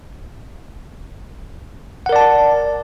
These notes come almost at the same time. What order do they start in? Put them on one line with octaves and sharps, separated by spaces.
F#5 A#4 D5 A5